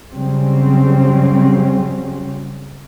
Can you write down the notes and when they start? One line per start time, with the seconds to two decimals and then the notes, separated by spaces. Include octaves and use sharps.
0.11 C#3 F#3 G3 C4 C#4